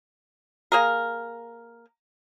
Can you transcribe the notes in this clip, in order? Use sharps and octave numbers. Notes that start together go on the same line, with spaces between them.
A#3 G#4 A#4